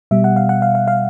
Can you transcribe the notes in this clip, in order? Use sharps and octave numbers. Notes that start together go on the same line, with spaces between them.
B2 G3 E5
F#5
F5
F#5
F5
F5
F5